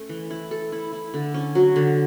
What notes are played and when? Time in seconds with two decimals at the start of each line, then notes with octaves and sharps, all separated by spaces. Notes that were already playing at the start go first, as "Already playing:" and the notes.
Already playing: A3 C#4
0.09 E3
0.30 E4
0.51 A4
0.72 E4
0.93 E4
1.14 D3
1.34 C#4
1.55 F#3
1.76 D3